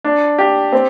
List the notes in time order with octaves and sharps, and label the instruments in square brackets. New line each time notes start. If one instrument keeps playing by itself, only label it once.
[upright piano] D4
G4
C4